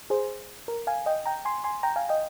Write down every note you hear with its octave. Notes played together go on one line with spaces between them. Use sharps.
G#4 C5
A#4
F5 G#5
D#5 G5
G5 A#5
G#5 C6
G#5 C6
G5 A#5
F5 G#5
D#5 G5